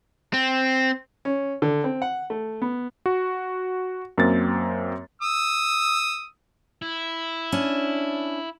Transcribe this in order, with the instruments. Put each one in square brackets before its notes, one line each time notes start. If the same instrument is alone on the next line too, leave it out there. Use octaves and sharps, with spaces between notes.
[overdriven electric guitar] C4
[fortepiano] C#4
D3
C4
F#5
A3
B3
[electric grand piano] F#4
F#2 A#3 C4 A6
[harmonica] D#6 E6
[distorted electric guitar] E4
[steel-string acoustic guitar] C#4 D4